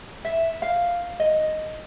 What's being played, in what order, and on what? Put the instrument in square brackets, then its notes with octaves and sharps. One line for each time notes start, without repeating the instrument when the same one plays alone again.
[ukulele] E5
F5
D#5